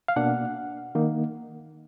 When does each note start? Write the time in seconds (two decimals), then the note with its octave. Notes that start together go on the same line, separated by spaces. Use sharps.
0.08 F5
0.16 B2 A#3 D4 F#5
0.95 D#3 A#3 D#4